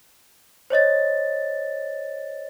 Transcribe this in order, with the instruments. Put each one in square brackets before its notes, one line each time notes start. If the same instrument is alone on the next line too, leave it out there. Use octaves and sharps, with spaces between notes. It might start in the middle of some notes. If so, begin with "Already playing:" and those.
[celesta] C5 C#5 D#5 A6